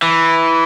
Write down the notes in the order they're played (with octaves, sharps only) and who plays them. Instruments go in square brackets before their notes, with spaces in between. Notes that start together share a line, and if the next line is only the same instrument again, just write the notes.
[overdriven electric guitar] E3